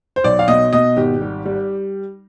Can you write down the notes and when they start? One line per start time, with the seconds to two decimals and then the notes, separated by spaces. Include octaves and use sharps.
0.16 C5
0.24 B1 D5
0.39 F5
0.48 B2 D#5
0.73 B2 D#5
0.97 G#1 G4
1.21 G3
1.45 G3